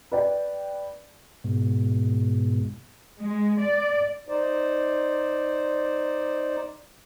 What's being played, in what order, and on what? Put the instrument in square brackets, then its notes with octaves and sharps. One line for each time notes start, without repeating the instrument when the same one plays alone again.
[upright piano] B4 D5 G5
[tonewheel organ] G#2 B2
[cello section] G#3
D5
[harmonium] D#4 C5 D5